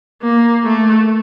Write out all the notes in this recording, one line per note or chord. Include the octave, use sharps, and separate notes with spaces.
A#3
A3